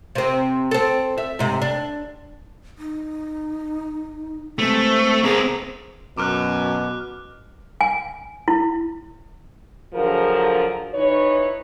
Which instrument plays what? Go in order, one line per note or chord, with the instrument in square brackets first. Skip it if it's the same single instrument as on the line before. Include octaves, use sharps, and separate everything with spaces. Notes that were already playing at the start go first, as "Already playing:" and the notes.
[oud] C3 C4
C4 A4
E5
G#2 C3
D4
[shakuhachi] D#4
[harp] C3 E3 G#3 [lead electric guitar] A3 [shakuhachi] C4
[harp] C3 B3 B4 [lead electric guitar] C4 A#4 [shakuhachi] G#4
[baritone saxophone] F#2 [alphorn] B2 [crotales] D6 F6 F#6
[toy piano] G#5
E4
[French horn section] D3 F3 F#3 G#4 A#4
E3 D#4 B4 C#5